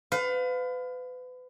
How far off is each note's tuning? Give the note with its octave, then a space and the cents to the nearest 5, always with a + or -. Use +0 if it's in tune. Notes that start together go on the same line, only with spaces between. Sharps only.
B4 +35 F5 +20